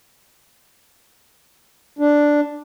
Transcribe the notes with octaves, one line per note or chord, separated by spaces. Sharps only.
D4